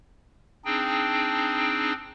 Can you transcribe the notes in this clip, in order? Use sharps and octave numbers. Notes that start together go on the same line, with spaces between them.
C4 D4 D#4 G#4 G5